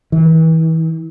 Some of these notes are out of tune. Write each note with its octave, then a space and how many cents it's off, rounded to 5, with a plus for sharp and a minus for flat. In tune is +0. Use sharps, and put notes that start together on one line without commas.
E3 -35